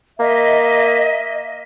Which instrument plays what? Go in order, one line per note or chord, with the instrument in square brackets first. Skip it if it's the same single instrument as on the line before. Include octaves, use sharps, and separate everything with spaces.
[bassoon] A#3 [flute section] D#5 E5